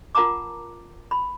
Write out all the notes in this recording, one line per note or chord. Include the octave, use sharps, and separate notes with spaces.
F4 A#4 F#5 A5 A#5 D6
B5